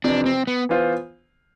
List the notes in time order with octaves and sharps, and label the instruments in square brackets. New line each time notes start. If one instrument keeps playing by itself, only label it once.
[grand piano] F2 C3 E3 [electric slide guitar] D4
[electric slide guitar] C4
B3
[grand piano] E3 B3 F4 C5